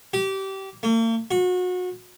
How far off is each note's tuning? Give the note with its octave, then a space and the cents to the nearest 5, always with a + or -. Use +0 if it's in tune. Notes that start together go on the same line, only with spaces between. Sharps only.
G4 -25
A#3 -45
F#4 -30